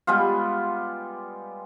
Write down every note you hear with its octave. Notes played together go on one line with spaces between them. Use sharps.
G3 G#3 B3 F4